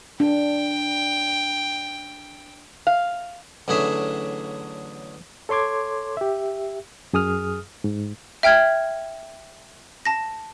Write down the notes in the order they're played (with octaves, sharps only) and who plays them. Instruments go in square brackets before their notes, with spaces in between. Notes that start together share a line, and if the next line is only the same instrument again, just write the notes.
[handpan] D4 [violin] G5
[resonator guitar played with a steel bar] F5
[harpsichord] A1 D3 F#3 G#4 E5
[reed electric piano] A4 C#5 C6 D6 G#6
G4 E5
F#2 G#4 D#6 F6
G#2
[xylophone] E5 G5 F6 G#6
A5 A#6